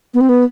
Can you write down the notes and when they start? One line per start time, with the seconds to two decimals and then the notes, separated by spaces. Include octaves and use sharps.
0.14 B3
0.21 C4
0.29 B3